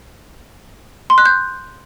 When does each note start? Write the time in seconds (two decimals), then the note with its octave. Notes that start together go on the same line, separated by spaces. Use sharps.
1.10 C6
1.18 F#6
1.26 G6